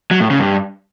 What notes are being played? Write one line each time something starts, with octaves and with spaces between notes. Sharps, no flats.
F#3
A2
C#3
G2